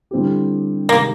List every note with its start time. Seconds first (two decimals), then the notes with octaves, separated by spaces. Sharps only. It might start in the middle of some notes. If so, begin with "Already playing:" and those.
0.11 D3 G3 C4 E4 G4
0.88 C3 D#3 G#3 A#3